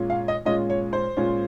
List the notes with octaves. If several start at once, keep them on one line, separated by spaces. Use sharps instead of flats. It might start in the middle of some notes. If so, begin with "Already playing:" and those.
Already playing: A#2 G#3 C#4 F4
F5
D#5
A#2 G#3 C#4 F4 D#5
C#5
C5
A#2 G#3 C#4 F4